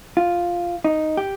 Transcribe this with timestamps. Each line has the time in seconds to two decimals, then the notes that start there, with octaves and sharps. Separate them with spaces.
0.17 F4
0.84 D#4
1.17 G4